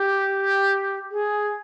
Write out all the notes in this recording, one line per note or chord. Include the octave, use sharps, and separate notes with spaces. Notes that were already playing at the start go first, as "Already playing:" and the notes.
Already playing: G4
G#4